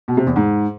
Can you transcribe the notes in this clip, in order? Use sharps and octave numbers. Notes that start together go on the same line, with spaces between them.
B2
C3
E2
G#2